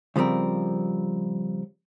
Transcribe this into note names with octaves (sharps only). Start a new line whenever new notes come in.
C#3 F3 G3 C4 A#4